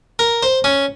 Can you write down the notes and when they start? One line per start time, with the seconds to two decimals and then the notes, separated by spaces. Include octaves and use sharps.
0.19 A#4
0.43 C5
0.64 C#4